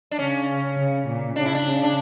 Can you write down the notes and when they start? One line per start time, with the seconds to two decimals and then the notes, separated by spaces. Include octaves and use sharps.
0.11 D4
0.19 C#3 C#4
0.78 C#3
1.07 A#2
1.36 C#3 D4
1.45 E4
1.54 D4
1.65 C#3
1.83 D4